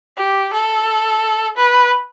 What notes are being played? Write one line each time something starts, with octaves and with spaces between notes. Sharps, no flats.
G4
A4
B4